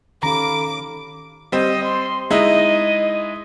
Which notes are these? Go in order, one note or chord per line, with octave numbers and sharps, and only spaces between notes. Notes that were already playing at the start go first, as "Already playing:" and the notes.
D#3 C#4 G4 A4 F5 A#5 B5 D6
G3 C4 D#5
C6
G#3 D#4 E4 D#5